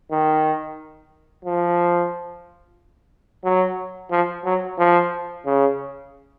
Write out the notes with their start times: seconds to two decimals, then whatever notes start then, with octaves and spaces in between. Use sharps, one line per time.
0.11 D#3
1.45 F3
3.45 F#3
4.11 F3
4.45 F#3
4.79 F3
5.46 C#3